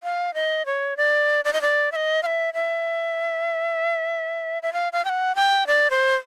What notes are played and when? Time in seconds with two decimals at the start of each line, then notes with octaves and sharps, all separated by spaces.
0.03 F5
0.34 D#5
0.66 C#5
0.97 D5
1.45 D5
1.53 D#5
1.62 D5
1.92 E5
1.96 D#5
2.23 F5
2.26 E5
2.54 E5
4.63 E5
4.73 F5
4.93 F5
5.05 G5
5.09 F#5
5.35 G5
5.67 D5
5.91 C5